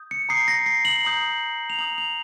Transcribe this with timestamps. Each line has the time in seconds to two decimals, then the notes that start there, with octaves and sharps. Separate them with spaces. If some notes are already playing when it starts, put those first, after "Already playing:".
Already playing: D#6 G6
0.11 C#7
0.29 A#5 D#6 G6 C7
0.48 A#6
0.66 C7
0.85 F#7
1.05 A#5 D#6 G6
1.70 F7
1.78 A#5 D#6 G6 F#7
1.98 F7